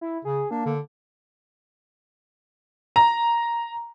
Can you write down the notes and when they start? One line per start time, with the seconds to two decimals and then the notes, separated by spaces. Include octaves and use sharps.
0.01 E4
0.25 C#3 G#4
0.51 A#3 D4
0.66 D3
2.96 A#5